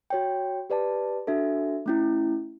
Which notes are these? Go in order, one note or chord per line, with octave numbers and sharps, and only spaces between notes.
F#4 C#5 G5
G4 B4 D5 A5
D4 F#4 A4 E5
A3 C#4 E4